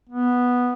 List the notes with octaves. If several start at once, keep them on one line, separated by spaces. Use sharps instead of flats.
B3